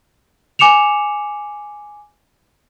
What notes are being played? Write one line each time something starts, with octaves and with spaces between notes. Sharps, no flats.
G#5 D6 C#7 E7 F7